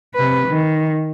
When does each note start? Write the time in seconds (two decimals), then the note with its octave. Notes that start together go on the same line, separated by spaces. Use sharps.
0.15 C3 B4
0.48 D#3